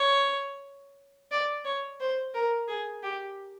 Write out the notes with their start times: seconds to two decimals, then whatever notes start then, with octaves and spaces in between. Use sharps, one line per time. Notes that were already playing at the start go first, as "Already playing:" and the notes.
Already playing: C#5
1.31 D5
1.65 C#5
2.00 C5
2.34 A#4
2.68 G#4
3.03 G4